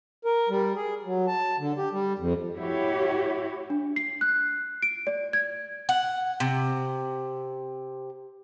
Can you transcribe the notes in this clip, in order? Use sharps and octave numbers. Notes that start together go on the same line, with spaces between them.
A#4
G3
G#4
F#3
A5
D3
G4
G3
F2
E4 F#4 G4 C#5
D4
C7
F#6
D7
D5
G#6
F#5
C3